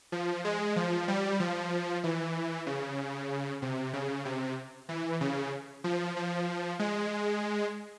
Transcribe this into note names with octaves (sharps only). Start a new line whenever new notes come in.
F3
G#3
F3
G3
F3
E3
C#3
C3
C#3
C3
E3
C#3
F3
F3
G#3